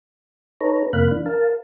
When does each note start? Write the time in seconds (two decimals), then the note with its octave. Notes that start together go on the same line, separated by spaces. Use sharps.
0.61 D#4 A4 B4 C#5 A#5
0.93 F2 C3 A#3 F5 B5 F#6
1.11 E3 D4
1.26 A#4 F5 A5